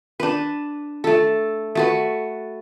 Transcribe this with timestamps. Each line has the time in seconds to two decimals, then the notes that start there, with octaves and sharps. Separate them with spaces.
0.20 D4 B4
1.04 A3 A4
1.75 A3 F#4 B4